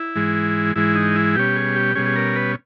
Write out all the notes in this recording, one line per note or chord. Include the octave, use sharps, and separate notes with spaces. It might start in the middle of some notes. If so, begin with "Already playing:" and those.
Already playing: E4
G#2 E3 G#3
G#2 E3 G#3 E4
D#4
E4
B2 G3 C#4 G4
G#4
G4
B2 G3 C#4 G#4
G#4
A#4
B4